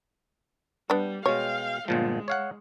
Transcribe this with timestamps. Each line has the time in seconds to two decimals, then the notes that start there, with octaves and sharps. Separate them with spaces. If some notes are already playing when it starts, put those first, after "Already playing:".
0.90 G3 B3 D4
1.26 B2 G#3 C#5 F5 G5
1.88 G1 A#2 F3 G#3
2.28 C#5 F5 F#5